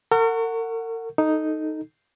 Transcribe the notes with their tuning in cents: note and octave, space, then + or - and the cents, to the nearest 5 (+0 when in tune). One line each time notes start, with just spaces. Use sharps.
A#4 -45 F#5 +0 C#6 +0
D#4 +0 A4 +0